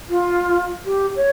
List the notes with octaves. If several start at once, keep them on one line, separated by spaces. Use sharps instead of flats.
F4
G4
C#5